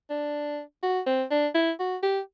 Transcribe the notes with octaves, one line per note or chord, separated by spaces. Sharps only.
D4
F#4
C4
D4
E4
F#4
G4